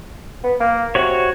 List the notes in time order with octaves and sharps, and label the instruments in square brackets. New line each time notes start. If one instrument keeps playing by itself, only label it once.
[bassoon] B3
A#3
[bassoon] C3 [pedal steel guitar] F#4 C#5